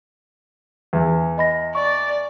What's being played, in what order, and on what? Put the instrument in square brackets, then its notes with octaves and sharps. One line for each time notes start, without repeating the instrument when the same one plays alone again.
[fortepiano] E2
[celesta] D#5 B5 A#6
[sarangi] D5 [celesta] C#6